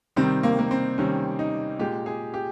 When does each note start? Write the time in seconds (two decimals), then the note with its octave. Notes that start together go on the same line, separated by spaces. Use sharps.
0.16 C3 D#3 G3 C4
0.43 A#3
0.59 A#3
0.71 C4
0.98 C3 D#3 G3 C#4
1.39 D#4
1.79 A#2 G#3 G4
2.06 G#4
2.34 G4